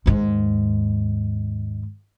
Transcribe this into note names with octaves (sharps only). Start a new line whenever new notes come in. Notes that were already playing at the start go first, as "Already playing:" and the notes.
D#2 G#2